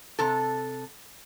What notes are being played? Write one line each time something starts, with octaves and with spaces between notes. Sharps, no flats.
C3 A4